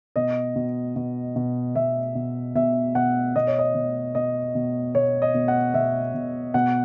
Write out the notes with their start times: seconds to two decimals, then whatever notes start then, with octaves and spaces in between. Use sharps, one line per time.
0.16 B2 D#5
0.56 B2
0.96 B2
1.36 B2
1.75 B2 E5
2.15 B2
2.55 B2 E5
2.95 B2 F#5
3.36 B2 D#5
3.47 C#5
3.59 D#5
3.75 B2
4.15 B2 D#5
4.55 B2
4.95 B2 C#5
5.22 D#5
5.34 B2
5.48 F#5
5.74 B2 E5
6.14 B2
6.54 B2 F#5